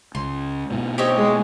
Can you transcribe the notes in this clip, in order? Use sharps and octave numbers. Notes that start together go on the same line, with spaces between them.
C#2 C6
G#2 B2
C4 G4 C#5 D#5
G#3 G#4